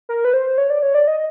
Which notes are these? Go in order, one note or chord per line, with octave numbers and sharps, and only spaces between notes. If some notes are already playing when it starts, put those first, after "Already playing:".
A#4
B4
C5
C#5
D5
C#5
D5
D#5